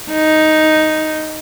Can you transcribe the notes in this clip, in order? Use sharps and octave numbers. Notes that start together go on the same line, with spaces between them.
D#4